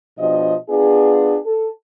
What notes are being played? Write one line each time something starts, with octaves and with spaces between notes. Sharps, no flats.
B2 F3 D4 G4 D#5
B3 D4 F4 G#4
A4